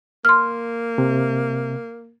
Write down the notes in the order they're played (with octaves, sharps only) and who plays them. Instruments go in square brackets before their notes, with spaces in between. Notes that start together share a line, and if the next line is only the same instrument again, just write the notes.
[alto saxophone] A#3 [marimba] C6 F6
[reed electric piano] C3